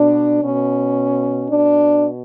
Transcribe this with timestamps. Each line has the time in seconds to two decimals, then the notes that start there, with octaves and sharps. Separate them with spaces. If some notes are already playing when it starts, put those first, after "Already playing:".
Already playing: B2 D4
0.42 B2 C#4
1.48 B2 D4